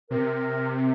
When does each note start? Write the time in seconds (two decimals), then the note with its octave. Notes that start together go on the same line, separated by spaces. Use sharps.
0.11 C3 A#4